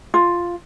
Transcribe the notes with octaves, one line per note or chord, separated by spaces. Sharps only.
F4